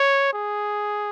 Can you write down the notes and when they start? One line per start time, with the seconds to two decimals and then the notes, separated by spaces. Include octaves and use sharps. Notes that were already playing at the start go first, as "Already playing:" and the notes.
Already playing: C#5
0.33 G#4